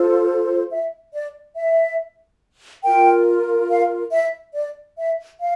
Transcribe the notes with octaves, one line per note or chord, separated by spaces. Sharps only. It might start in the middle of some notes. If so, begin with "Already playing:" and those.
Already playing: F4 A4 C5
E5
D5
E5
F4 A#4 G5
F5
E5
D5
E5
F5